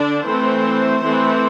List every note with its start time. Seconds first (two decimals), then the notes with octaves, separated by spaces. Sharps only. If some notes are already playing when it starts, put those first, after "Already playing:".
Already playing: D3 D4 D5
0.25 E3 A3 C4 C5
1.02 E3 A3 C4